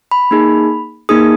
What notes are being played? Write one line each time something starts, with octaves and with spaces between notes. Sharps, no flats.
B5
A#3 D#4 G#4
A#3 D#4 G#4 D#6